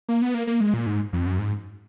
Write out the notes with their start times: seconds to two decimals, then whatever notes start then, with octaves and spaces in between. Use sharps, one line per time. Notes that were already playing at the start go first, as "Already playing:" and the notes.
0.09 A#3
0.22 B3
0.34 A#3
0.47 A#3
0.61 G#3
0.74 A#2
0.86 G#2
1.13 F2
1.26 F#2
1.39 G#2